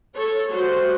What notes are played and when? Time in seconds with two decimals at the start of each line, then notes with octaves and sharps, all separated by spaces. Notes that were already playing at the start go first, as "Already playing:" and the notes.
0.16 A4 C#5
0.51 G3 F#4 C5